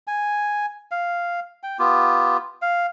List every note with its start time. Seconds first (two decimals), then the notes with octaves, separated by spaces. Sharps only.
0.07 G#5
0.91 F5
1.63 G5
1.79 B3 F4 G4
2.62 F5